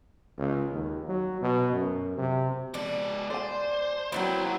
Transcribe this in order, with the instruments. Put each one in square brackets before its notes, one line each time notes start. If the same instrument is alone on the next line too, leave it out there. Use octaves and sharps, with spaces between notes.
[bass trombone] C#2
D#2
F#3
B2
F#2
C3
[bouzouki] B2 D4 [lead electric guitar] G#3 D5
[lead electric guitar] C5 [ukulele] D5 G#5
[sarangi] F#3 [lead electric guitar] A#3 B4 [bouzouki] C4 E4 G5